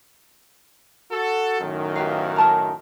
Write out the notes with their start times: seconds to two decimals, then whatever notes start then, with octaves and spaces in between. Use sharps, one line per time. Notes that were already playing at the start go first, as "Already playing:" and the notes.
1.12 F#4 A4
1.61 F#2 A2 D#3
1.96 G4 B4 F5
2.36 A#4 A5 A#5